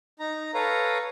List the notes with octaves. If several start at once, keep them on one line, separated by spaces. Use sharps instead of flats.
D#4 A#5
A4 B4 C#5 F5 A#5